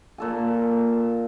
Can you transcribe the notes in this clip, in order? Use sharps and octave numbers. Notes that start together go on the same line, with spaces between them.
A#2 A4 G#5